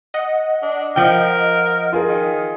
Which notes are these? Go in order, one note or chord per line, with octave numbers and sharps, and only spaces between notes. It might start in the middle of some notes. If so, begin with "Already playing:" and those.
D#5 F#5
D4
F3 A#4 G5
F4 G#4 A#4
D#3